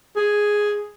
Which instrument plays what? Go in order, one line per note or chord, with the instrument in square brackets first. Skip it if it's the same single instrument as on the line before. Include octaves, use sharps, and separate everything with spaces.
[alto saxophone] G#4